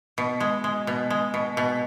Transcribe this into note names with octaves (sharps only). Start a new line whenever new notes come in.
B2
G#3
G#3
B2
G#3
B2
B2